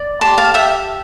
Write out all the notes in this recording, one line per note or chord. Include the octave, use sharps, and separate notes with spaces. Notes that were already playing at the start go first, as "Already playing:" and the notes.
Already playing: D5
G4 A5 C6
F5 A5
G4 E5 G5